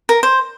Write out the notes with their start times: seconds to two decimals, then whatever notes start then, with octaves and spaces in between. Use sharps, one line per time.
0.09 A#4
0.23 C5